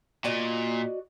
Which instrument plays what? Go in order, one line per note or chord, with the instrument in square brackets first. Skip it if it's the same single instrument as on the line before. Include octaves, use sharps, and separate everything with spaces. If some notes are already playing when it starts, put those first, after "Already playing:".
[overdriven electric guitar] A#2 [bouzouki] F#4 D5 D#5